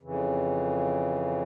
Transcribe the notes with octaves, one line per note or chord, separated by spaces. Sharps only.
F2 C#3 E3